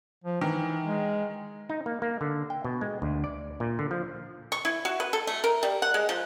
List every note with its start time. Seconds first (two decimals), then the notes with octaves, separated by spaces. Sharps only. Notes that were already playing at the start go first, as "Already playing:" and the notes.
0.24 F3
0.41 D#3 E3
0.83 G#3
1.69 D#4
1.86 A#3
2.02 A#3
2.21 D3
2.50 G5
2.65 B2
2.81 G#3
3.02 D2
3.24 D5
3.60 A#2
3.79 D3
3.91 F3
4.52 C#6
4.65 E4
4.85 F#4
5.00 B4
5.13 A4
5.27 A3
5.44 A#4
5.63 G3
5.82 F#5
5.94 G#3
6.09 F3